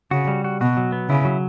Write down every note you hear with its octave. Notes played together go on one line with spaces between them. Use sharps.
C#3 F#4
G3
F#4
B2 F#4
F#3
B3
C#3 E4
F#3